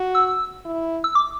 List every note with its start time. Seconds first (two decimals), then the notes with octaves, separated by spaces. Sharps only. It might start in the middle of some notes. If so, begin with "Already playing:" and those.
Already playing: F#4
0.15 E6
0.65 E4
1.04 E6
1.15 D6